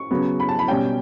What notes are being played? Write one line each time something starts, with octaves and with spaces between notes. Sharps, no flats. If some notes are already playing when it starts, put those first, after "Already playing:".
Already playing: C#6
C#3 F#3 B3
B5
A5
B5
B2 G3 C#4 G5